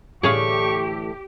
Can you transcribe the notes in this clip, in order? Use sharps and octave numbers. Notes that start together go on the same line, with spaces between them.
A2 D3 E3 G4 G#4 C#5 F5 C#6